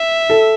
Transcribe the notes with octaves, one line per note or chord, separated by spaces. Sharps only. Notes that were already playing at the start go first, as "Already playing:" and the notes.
Already playing: E5
A4